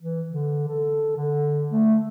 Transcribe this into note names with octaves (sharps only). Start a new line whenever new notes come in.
E3
D3
A4
D3
A3